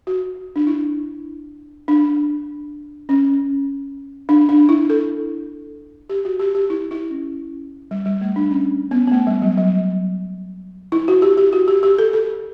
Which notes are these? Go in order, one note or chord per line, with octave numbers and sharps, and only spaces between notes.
F#4
D4
E4
D4
C#4
D4
D4
E4
A4
G4
F#4
G4
G4
E4
E4
C#4
G3
G3
A3
D4
C#4
B3
B3
A3
G3
F#3
F#3
E4
F#4
G4
G4
F#4
G4
G4
A4
A4